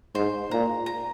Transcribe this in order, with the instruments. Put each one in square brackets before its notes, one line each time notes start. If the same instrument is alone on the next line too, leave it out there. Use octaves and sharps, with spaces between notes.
[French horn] G#2 [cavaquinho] C5
[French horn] A#2 [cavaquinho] A#5
[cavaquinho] A#5